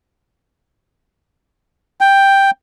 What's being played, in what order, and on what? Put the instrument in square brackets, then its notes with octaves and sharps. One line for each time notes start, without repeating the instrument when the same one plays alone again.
[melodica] G5